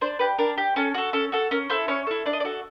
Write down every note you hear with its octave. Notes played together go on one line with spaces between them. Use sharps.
D4 C5
G4 B4
D4 A#4
G4
C#4 A4
F#4 A4
C#4 A4
F#4 A4
C#4 A#4
E4 A4 C5
C#4 C#5
E4 A4
D4 D5
D#5
D5
F#4 A4